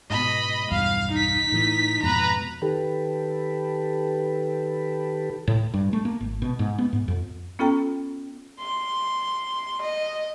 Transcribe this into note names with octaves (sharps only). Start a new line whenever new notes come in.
G#2 B2 D#5 B5
B1 E2 G2 F5
D#4 B6
A2 E3
F2 G#2 B2 B4 A#5
D#3 G4 A4 B4
A2
G2
A3
A#3
G#1
B2
G#2
B3
G#2
F2
B3 C#4 F4 A4 G5 A#5
C6
D#5